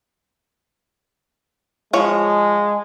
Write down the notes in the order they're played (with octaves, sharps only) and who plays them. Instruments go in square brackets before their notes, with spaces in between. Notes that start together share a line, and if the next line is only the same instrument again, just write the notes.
[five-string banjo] F3 C#5 [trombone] G#3